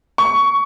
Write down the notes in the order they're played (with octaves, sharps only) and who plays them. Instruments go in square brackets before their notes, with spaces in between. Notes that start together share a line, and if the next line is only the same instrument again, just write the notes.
[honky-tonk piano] C#6